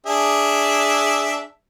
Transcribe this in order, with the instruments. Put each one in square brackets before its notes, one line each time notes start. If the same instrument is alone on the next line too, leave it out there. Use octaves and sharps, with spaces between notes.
[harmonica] D4 G#4 E5